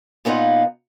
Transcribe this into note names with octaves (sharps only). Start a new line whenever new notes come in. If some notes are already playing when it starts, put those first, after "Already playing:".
A#2 B3 D#4 F4 F#5